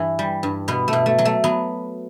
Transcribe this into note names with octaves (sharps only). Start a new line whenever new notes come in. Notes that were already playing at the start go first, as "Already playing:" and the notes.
Already playing: G2 E3
G3
G2
B2 B3
A3
B2
A3
F#3
A3
F#3 B3